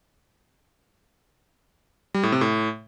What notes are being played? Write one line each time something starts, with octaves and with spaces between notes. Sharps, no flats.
G3
A2
C3
A2